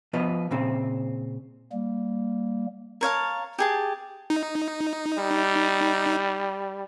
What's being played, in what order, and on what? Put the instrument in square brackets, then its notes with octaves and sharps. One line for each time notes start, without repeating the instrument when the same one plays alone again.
[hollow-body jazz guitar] F3 B3 F4 B4 D#5
A#2 C#3 C4
[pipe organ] G3 A#3
[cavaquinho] A#4 C#5 F5 A5
G4 G#4 A5
[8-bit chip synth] D#4
[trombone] G3